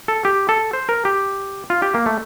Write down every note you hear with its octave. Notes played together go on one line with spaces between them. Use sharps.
A4
G4
A4
C5
A#4
G4
F4
G4
A#3
A3